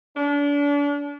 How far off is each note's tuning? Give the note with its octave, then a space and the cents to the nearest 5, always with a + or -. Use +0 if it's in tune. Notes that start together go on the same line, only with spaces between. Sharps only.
D4 -35